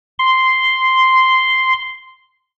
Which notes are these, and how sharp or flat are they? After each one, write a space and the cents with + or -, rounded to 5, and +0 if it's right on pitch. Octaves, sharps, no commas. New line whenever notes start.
C6 -5